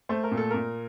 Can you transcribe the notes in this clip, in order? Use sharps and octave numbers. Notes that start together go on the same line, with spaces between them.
A3 C5
A#4
A#2
A4
A#2 A#4